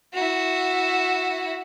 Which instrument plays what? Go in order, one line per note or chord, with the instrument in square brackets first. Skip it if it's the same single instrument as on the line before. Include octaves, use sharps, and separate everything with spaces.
[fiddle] E4 F#4